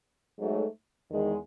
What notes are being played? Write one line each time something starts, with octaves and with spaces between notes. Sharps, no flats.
G#2 F#3 A3
E2 D#3 G#3